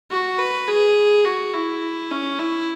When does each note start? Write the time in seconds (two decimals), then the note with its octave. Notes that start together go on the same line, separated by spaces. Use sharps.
0.11 F#4
0.39 B4
0.68 G#4
1.25 F#4
1.53 E4
2.11 C#4
2.40 E4